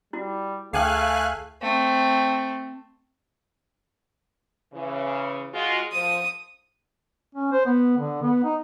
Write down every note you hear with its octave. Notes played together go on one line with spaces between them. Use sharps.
G3 E4 F#4
D2 A3 G#4 A4 F5 G5 G#5 F#6
A3 C4
C#3 E3
G#3 F4 F#4
F3 D#6
C#4
C5
B3
D3
B3
D#4